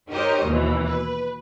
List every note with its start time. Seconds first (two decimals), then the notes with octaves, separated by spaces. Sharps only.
0.10 D#4 G4 A#4 C5 C#5 D#5
0.44 D#2 B2 E3
0.86 B4